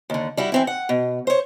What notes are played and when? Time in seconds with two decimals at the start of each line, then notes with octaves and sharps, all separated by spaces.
0.10 D#2 D3
0.37 G3 E4 F#4
0.52 E3 C4 E4
0.67 F#5
0.89 B2
1.27 C5 C#5